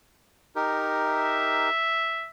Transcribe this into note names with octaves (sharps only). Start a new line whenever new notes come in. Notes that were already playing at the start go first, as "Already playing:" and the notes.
D#4 G4 A#4
E5